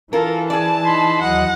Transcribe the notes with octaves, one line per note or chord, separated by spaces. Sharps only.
E3 F4 A4 A#4
G#4 D5 A5
D#4 B5 C6
D#2 F#3 D#5 F#5